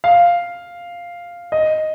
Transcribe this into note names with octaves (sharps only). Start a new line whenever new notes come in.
F5
D#5